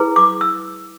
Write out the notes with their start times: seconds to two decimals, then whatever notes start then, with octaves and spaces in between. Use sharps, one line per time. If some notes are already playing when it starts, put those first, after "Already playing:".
Already playing: E4 G#4 B4
0.16 D6
0.41 E6